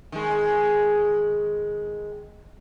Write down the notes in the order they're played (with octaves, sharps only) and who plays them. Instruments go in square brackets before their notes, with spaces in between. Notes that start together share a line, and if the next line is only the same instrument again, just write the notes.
[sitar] D#3 G#3